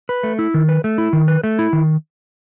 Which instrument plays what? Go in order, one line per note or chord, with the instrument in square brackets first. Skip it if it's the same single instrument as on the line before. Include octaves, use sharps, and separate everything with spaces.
[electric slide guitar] B4
A3
E4
D#3
B4
A3
E4
D#3
B4
A3
E4
D#3